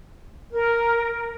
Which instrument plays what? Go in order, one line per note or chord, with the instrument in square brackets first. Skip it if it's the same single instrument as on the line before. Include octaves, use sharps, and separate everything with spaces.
[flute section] A#4